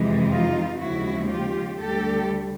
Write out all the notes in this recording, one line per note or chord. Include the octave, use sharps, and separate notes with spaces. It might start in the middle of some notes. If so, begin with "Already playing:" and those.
Already playing: F2 C3 E3 G#3
D#4 F4
D#2 C#3 F3 G#3 E4 F#4
F4 G4
D2 D3 G3 G4 A4